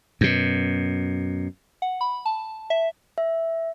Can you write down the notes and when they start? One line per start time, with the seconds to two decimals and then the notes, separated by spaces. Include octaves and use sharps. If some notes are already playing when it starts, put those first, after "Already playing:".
0.21 F#2 B2
1.82 F#5
2.01 B5
2.26 A5
2.70 E5
3.18 E5